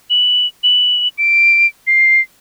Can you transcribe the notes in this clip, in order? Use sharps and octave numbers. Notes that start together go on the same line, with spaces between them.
F#7
F#7
D7
C7